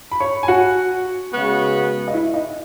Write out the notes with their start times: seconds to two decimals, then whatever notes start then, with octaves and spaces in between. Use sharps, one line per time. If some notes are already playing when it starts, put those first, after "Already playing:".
0.11 B5
0.20 C#5 C#6
0.43 G#5
0.48 F#4 F#5
1.31 C#3 G#3 B3 F#4
2.08 D#5
2.13 E4 E5
2.34 D#4 D#5